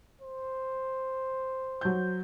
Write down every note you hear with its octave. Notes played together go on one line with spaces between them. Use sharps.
C5
F#3 G6